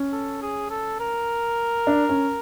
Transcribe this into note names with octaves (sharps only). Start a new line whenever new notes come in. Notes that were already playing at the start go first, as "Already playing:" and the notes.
Already playing: C#4
A4
G#4
A4
A#4
D4
C#4